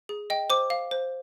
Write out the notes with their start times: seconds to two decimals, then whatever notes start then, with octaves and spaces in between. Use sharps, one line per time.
0.09 G#4
0.30 D#5 G5
0.50 C5 D6
0.70 F5
0.91 C5